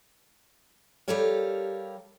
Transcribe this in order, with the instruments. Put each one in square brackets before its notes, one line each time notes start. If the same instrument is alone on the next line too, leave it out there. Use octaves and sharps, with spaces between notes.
[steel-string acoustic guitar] G3 G4 A4 A#4 C#5 F5